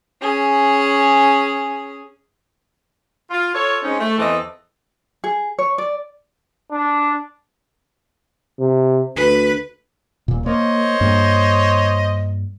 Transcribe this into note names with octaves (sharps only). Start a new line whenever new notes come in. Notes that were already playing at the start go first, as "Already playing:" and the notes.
C#4 G#4
F4
F4 A4 C#5
G#3 C4 C#4 D#4
A3
E2 E3 C4 A4 D#5
G#4
C#5
D5
D4
C3
D2 B4
D#1 A#2
A#3 C5 C#5 D#5
G2 A#3